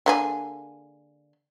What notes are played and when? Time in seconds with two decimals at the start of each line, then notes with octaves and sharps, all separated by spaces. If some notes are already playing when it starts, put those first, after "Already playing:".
0.06 D3 A#3 G#4